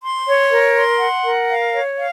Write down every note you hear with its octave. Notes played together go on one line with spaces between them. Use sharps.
C6
C#5
A#4
C6
F#5
A#4
F5
C#5
F5